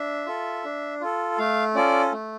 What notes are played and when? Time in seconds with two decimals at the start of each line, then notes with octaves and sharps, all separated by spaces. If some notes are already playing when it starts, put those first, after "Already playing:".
Already playing: D4 E5
0.26 F4 A4
0.65 D4
1.01 F4 A4
1.38 A3 F5
1.75 C#4 F4 A4 D5
2.13 A3